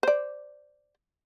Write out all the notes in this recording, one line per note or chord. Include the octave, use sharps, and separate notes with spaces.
C5 D5